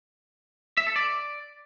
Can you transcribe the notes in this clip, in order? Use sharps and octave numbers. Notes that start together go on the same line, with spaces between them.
E5
A4
D5